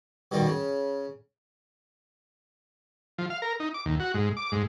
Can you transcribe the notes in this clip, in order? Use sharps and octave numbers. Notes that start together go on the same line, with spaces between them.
G2 B2 D#3 G3
C#3
F3
F5
A#4
D#4
D6
D#2
F#4
G#2
D6
G#2